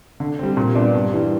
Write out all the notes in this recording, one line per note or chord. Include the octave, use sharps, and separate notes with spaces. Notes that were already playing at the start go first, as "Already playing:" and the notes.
D3
G3 C4
A#2
G3 B3 D4
G2
E3 G3